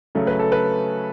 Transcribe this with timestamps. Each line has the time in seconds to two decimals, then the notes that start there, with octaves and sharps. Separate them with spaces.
0.15 C#3 F#3 A3 C#4
0.27 B4
0.40 A4
0.52 B4